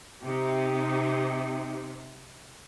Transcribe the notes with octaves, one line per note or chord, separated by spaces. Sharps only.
C3 D#4 G4